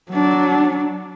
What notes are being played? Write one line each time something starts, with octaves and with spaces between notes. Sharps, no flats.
F#3 D4